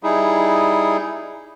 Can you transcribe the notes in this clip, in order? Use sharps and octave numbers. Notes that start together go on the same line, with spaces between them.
G3 D#4 E4 G#4